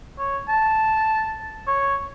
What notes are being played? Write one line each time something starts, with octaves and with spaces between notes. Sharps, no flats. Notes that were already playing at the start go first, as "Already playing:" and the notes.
C#5
A5
C#5